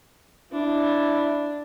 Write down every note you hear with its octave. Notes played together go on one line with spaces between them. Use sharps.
D4 E4